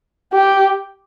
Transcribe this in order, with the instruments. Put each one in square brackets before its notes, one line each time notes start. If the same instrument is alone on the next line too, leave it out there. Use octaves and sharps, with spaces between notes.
[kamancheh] G4